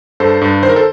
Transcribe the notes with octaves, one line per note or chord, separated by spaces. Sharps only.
G2 A4 C5
G2
D#3 C5
A#4
A4 C5